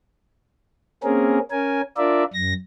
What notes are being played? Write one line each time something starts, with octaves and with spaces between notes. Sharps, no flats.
A#3 C4 C#4 G#4 A#4
C#4 A#4 G#5
D4 F4 A#4 D5 E5
F#2 A#6